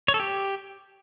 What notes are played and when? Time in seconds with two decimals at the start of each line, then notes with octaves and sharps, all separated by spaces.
0.08 C#5
0.14 A4
0.20 G4